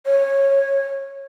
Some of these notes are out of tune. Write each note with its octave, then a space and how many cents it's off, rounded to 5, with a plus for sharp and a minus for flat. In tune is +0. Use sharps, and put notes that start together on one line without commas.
C#5 -15